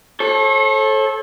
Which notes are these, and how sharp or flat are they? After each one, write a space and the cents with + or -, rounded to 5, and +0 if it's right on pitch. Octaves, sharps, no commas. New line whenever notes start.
A4 -15 C#5 -45